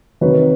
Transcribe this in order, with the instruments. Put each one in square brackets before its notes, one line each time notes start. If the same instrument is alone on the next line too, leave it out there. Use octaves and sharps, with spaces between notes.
[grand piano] C3 D#3 F#3 B4 C#5